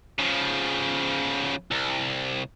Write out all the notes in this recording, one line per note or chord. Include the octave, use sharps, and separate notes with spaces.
C#3 F3
C2